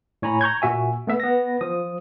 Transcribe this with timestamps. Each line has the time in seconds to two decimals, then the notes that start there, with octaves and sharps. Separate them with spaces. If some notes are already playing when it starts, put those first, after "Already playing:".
0.22 A2 C#5 G#5 A#5 B5
0.41 A#5 C#6 G6 G#6
0.62 A#2 F#4 E5 G#5
1.07 A3 B3 E5
1.20 B3 A#6
1.61 F3 D#6